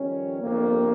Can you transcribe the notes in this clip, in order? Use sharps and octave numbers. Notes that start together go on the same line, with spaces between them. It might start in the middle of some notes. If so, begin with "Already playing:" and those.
Already playing: F2 D#3 G3 C#4
G1 F2 C3 A#3